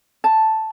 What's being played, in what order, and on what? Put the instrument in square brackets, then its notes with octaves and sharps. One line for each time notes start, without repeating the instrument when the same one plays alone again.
[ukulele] A5